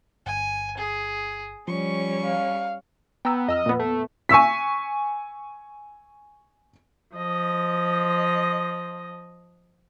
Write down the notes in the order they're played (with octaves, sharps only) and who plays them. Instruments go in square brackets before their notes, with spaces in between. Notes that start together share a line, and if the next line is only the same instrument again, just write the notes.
[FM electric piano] G1 [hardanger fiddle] G#5
[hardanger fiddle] G#4
[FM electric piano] F3 [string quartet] G3 C#4 [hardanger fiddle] C#6
[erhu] F5
[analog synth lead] B3 [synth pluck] G5 A#5 E6
[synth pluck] F2 E6 F6 [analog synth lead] D#5
[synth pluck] A#2 B3
[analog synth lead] A3
[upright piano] G#5 C#6 E6 B6
[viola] F3 D#5